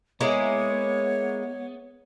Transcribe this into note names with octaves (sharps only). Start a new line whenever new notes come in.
G#3 A#3 B3 E4 C#5